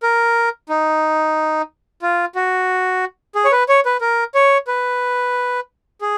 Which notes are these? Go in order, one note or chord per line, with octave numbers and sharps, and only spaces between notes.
A#4
D#4
F4
F#4
G#4
C#5
B4
C#5
B4
A#4
C#5
B4
G#4